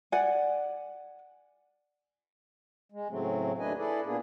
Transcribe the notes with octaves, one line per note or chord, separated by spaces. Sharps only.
D5 F#5 G#5
G#3
A2 C#3 F#3 A3 C4
D#2 A3 D4 B4 D#5 G#5
E4 G#4 A4 B4 D5
A#2 A#3 B3 D4 G#4